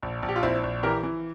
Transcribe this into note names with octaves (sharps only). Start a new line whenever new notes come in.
A#1
A#1
G4
F4
A#1 C4 E4
A#1
E3 G4 A#4
E3